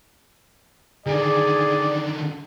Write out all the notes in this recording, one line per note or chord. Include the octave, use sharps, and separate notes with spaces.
D3 D#3 G#4 D5